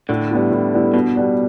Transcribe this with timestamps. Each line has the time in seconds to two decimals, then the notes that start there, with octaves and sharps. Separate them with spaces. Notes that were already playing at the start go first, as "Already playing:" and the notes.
0.09 A2 D3
0.31 G3 B3 E4
0.52 A2
0.73 G3 B3 E4
0.94 G2 B2
1.16 G3 B3 D4